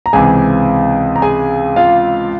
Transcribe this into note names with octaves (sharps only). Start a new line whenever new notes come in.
A#5
C#2 C3 E3 G#4 G#5
A#5
G#4 G#5
F4 F5